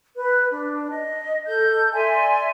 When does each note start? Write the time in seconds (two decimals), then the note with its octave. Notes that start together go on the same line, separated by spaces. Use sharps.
0.16 B4
0.51 D4
0.91 D#5
1.46 A4 G6
1.93 D5 E5 G#5 C6